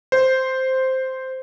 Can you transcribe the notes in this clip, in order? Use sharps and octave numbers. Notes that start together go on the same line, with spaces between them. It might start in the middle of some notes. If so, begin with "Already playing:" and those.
C5